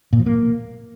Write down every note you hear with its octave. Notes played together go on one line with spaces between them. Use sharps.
A#2
F3
A#3